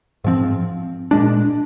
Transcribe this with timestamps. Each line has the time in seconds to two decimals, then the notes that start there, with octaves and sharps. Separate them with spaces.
0.24 G#2 F3 C4
1.11 A#2 G#3 D4